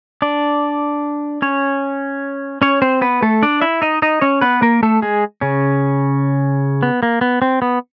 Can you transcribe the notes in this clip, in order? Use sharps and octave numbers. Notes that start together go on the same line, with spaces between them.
D4 D5
C#4 C#5
C#4 C#5
C4 C5
B3 B4
A3 A4
D4 D5
E4 E5
D#4 D#5
D#4 D#5
C#4 C#5
B3 B4
A#3 A#4
A3 A4
G#3 G#4
C#3 C#4
B3
A#3
B3
C4
B3